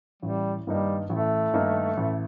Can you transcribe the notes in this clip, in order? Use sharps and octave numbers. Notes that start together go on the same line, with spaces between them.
A1 G3
G2 D#3 G3 A#3 D#4
A1 A3
G2 D#3 A#3 D#4
A1